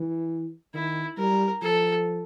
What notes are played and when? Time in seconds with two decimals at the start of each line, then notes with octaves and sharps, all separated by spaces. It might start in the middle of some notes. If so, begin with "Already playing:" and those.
Already playing: E3
0.74 D#3 E4
1.18 G3 A#4
1.62 F3 A4